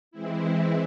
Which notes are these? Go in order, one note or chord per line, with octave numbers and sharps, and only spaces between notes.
E3 G#3 C4 E4